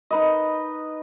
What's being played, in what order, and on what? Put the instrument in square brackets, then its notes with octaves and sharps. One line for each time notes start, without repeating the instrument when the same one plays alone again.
[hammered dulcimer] D#4 B4 D#5